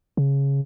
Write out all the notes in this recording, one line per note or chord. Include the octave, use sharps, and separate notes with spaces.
C#3